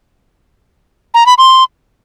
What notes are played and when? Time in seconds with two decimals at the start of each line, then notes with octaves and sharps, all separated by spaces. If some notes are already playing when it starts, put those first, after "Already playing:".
1.14 A#5
1.26 B5
1.38 C6